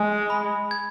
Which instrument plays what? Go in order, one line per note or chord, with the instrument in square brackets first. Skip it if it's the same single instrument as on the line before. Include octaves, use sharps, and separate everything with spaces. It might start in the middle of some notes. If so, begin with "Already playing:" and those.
Already playing: [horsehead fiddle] G#3 [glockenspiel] G#5
[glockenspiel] B5
G#6